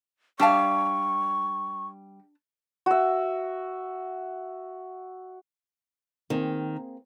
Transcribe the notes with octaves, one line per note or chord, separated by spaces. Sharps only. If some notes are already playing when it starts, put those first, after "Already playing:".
G3 D4 F5 A5 C#6
F#4 E5
D#3 A#3 C4 G#4